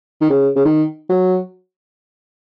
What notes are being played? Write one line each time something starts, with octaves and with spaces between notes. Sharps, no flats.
D#3
C#3
C#3
D#3
F#3